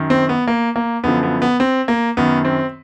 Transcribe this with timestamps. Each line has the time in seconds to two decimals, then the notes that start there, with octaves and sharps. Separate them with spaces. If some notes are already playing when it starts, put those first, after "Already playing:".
Already playing: F#2 D#3
0.10 C4
0.29 B3
0.48 A#3
0.76 A#3
1.04 F#2 D3 F3 B3
1.23 B3
1.42 B3
1.60 C4
1.88 A#3
2.17 F#2 D#3 B3
2.45 C4